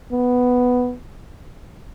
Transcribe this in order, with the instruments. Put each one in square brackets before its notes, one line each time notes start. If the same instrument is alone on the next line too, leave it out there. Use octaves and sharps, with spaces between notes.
[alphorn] B3